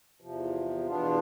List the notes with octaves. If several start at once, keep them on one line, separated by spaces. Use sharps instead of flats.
E2 C3 F3
E2 B2 B3 D4 F4